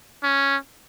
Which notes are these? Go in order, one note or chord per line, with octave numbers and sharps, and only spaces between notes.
C#4